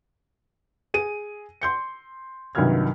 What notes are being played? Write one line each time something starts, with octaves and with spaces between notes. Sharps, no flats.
G#4 D#7
C6 G6 C#7
C2 G2 D#3 F#3 F6 G#6